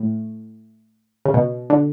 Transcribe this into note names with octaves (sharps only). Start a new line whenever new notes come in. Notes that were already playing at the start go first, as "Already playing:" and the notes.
Already playing: A2
C#3
B2
D3